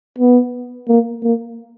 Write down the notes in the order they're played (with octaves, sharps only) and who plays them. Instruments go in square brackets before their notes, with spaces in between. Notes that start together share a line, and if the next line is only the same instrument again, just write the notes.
[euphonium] B3
A#3
A#3